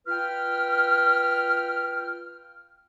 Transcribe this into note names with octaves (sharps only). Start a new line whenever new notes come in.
F4 B4 G5 F6